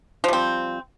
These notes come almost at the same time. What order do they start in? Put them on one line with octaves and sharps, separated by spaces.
F3 G3 C4